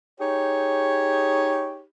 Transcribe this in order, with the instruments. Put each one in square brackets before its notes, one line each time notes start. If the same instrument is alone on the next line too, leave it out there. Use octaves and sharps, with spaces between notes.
[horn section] D#4 G4 G#4 C#5